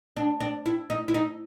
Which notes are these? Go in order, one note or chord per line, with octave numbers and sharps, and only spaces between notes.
D4
D4
E4
D#4
E4
D#4